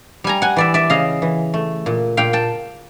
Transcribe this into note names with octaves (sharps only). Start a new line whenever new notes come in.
G3 G#5 A#5
F#5 G#5
E3 D5 E5
D5 E5
C#3 D#5 F5
E3
A3
A#2
A#2 F5 G5
G5 A5